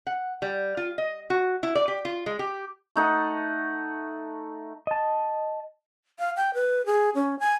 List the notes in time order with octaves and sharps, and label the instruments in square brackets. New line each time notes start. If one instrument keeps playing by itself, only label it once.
[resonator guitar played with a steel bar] F#5
G3
F4
D#5
F#4
E4
D5
G4
F4
G#3
G4
[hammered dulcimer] A3 D#4 F#5
[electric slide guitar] D#5 A5
[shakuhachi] F5
G5
B4
G#4
C#4
G#5